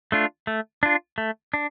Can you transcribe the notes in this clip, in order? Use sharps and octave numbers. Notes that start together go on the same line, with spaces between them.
A3 D4 F4
A3
D4 F4
A3
D4